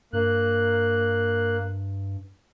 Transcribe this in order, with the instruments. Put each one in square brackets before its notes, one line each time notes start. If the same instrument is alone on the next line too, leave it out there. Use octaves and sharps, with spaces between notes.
[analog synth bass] G2 [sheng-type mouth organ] A#3 F#6